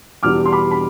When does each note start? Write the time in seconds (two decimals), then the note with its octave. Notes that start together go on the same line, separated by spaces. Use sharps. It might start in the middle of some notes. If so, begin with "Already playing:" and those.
0.23 E2 B2 G3 D6 F6
0.45 C6
0.52 B5 D6
0.71 B5